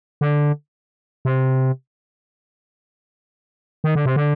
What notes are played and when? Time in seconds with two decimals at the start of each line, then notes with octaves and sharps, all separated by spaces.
0.21 D3
1.25 C3
3.84 D#3
3.95 D3
4.06 C3
4.16 D3